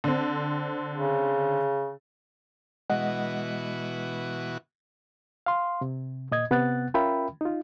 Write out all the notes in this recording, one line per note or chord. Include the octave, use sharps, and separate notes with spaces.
D3 C4
C#3
B2 E3 G#3 F#4 D#5 F#5
F5 C6
C3
A#2 D#5 G#6
C3 B3 F#5 F#6 A6
C#4 F4 A#4 E5 G5 B5
D#4 F4